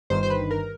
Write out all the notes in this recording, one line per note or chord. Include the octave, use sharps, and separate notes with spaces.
G1 G2 D#3 C5
C5
B4
A#4